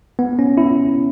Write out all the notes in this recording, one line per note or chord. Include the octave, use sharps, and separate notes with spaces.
B3
C#4
E4